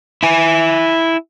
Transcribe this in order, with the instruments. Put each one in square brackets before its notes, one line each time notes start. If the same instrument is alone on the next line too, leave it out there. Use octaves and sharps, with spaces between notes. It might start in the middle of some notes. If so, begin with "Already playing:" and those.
[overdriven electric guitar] E4 G#5